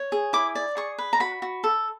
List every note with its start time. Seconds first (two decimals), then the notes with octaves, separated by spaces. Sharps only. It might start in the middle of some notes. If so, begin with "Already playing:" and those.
Already playing: C#5
0.12 G#4
0.33 E4 D6
0.55 D5
0.77 G#4 C#6
0.98 B4
1.13 A#5
1.20 F#4 B5
1.42 F#4
1.64 A4